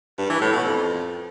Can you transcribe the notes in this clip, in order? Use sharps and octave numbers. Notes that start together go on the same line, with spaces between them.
G2
E3
A2
B2
F2